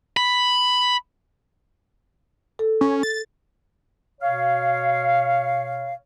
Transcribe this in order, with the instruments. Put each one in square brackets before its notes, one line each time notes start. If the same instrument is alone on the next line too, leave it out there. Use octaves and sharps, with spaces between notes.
[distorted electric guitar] B5
[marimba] A4
[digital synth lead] C#4
A6
[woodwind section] B2 C#5 F5